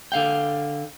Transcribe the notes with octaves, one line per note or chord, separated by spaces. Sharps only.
D3 F5 G5